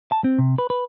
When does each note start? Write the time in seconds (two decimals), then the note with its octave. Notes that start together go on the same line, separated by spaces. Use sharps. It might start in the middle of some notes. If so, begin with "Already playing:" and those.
0.12 A5
0.24 C4
0.38 C3
0.58 B4
0.70 B4